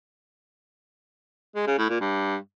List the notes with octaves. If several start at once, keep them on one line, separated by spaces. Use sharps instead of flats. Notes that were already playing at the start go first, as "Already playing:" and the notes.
G#3
C#3
A2
A#2
G2